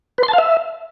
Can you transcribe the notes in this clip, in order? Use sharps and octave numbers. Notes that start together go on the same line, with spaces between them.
B4
C6
A5
F5
E5